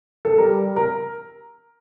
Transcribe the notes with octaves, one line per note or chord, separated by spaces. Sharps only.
A4
G3 A#4
A#4